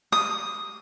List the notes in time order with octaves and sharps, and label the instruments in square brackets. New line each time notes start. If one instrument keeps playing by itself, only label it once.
[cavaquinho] D#6